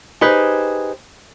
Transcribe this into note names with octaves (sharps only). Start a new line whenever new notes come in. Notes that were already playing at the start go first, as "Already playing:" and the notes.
D#4 G4 G#4 B4 C5